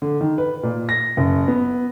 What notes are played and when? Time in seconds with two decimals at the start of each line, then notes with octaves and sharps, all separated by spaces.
0.02 D3
0.21 D#3
0.38 B4
0.63 A#2
0.89 A#6
1.17 F#1
1.48 B3